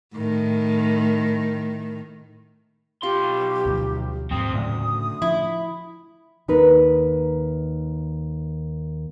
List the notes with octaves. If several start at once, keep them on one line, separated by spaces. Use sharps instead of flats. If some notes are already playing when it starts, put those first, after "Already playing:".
A2 D#3
B1 F4 G4 C6
D2 B2 F3
D#2 G#2 F3 C4 D#6
D2 A2 C#3 F#3
F3 E4
D#2 D#4 A#4 B4